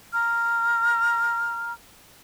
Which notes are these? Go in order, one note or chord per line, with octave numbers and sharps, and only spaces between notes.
A#5 F6